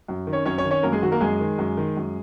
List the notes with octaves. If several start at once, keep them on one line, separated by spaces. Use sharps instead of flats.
F#2
D#3
C#4 C#5
F#2 C#4 C#5
C#4 C#5
D#3
C#4 C#5
F#2 A#3 A#4
G#3 G#4
D#3 F#3 F#4
A#3 A#4
F#2 G#3 G#4
D#3
F#2
D#3
F#2